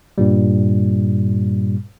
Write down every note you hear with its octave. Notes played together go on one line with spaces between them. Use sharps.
G2 A#2 G3